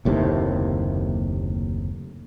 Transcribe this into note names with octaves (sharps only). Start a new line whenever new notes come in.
F#1 D#2 A2 C3